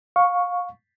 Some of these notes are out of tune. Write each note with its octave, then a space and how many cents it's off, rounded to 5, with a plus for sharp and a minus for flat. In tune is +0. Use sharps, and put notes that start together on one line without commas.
F5 +25 C#6 +0